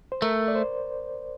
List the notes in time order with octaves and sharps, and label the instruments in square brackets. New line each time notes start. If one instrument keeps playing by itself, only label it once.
[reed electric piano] C5
[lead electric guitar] A3 [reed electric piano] A#4
[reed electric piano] D5
C5